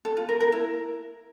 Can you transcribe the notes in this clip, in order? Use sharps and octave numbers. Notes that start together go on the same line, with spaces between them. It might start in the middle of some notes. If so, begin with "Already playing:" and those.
A4
F4
A#4
A#4
E4